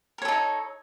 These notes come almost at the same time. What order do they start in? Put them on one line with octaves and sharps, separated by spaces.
A#4 C#5 A4 D#4